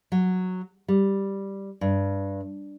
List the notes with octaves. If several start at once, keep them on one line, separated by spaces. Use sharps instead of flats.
F#3
G3
G2